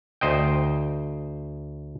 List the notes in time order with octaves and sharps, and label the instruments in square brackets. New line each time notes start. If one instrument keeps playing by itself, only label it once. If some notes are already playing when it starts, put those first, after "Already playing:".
[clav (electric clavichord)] D2 C5 D#5 G5